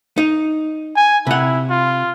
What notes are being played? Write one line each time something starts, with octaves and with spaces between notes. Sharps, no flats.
D#4
G#5
C3 E4 F#5
F4